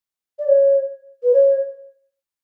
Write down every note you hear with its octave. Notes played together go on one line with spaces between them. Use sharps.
D5
C#5
B4
C#5